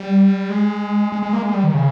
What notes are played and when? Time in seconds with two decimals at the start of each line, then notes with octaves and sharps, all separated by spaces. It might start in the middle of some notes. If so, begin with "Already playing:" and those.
Already playing: G3
0.50 G#3
1.12 G#3
1.23 G#3
1.33 A#3
1.42 G#3
1.53 G3
1.64 D#3
1.74 C#3